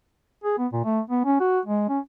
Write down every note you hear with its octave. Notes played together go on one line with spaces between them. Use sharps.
G#4
B3
A#2
A3
B3
C#4
F#4
G#3
C#4